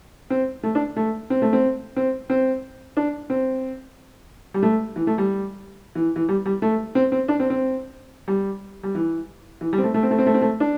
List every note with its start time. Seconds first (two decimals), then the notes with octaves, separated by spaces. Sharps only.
0.30 C4
0.63 A3
0.75 D4
0.96 A3
1.30 C4
1.42 A3
1.53 C4
1.96 C4
2.30 C4
2.97 D4
3.30 C4
4.54 G3
4.63 A3
4.96 E3
5.07 A3
5.18 G3
5.95 E3
6.16 E3
6.29 G3
6.46 G3
6.62 A3
6.95 C4
7.12 C4
7.28 D4
7.40 C4
7.50 C4
8.28 G3
8.83 G3
8.95 E3
9.61 E3
9.73 G3
9.78 C4
9.83 A3
9.94 A3
10.03 C4
10.11 A3
10.18 C4
10.26 A3
10.34 C4
10.42 A3
10.60 D4